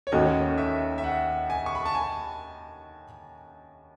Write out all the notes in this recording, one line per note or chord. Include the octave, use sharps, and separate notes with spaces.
C#5
D#2 D#3 A3 C#4 F#4 D#5
E5
E5
F#5
G#5
C#6
B5
A5
G#5